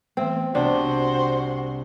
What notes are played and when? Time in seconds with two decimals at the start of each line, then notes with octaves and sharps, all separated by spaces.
0.17 E3 A3 B3 C4
0.55 C2 D4 F#4 C5